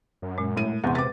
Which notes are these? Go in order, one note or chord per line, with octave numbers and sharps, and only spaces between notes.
F#2
A#2 G#3
A2 D#7
E2 C3 F#5 C6
B4 D6 A6